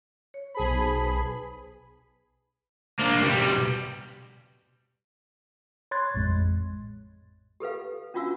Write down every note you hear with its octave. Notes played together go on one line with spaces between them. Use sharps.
C#5
B1 G#4 C5 A5 B5
B4
A#3 D4
B1 G3
C#5 B5 C6 F#6 G#6 A6
A1 F2 A2 G#3
G4 A4 B4 F5
C#4 D4 F4 F#4 F5 E6